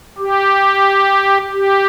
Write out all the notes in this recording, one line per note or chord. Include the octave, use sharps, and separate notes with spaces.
G4
G4